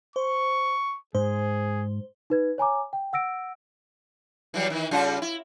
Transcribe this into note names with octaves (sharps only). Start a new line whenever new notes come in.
C5 C#6
G#2 G#4 C5
D#4 B4 G#6
C#5 G#5 A#5 D6
G5
F#5 E6 A#6 D7
E3 F#3 G3
D#3 E3
C#3 G3 F4
E4